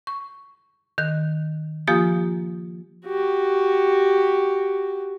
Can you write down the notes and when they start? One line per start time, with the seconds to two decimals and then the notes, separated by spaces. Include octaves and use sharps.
0.07 C#6
0.98 D#3 F#6
1.88 F3 A#3 F4 G4 G#5 D#6
3.06 F#4 G4